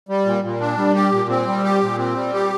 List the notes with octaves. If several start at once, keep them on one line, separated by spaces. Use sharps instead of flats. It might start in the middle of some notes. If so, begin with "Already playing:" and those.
G3
A#2
A#2
D4
G3
G4
A#2
C4
G3
G4
A#2
C4
G3
G4